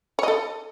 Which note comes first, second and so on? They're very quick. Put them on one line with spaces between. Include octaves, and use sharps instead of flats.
C#5 D#5 A4